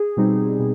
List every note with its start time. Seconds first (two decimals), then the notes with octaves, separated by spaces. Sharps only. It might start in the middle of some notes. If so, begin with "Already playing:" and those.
Already playing: G#4
0.17 B2 G3 C4 D#4
0.59 B2